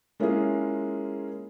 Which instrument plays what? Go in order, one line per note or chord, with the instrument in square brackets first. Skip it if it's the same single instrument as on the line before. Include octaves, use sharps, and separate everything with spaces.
[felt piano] G#3 A#3 C#4 E4 F4 G#4